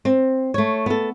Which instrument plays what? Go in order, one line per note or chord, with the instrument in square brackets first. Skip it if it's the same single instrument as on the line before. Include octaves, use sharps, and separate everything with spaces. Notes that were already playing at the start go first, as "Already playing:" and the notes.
[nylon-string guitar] C4
A3 C#5
B3 A4